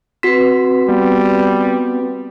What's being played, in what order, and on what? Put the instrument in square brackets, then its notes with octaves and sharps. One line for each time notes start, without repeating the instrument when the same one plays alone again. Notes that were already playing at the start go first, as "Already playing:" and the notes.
[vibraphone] C4 B4 [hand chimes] F#4 B6
[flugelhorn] G3 [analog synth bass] B3